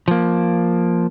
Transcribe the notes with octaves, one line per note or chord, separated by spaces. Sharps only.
F3 A#3